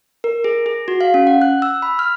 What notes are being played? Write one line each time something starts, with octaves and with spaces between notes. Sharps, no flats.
A#4
G#4
G#4
F#4
F5
C#4
F#5
F#6
E6
B5
F6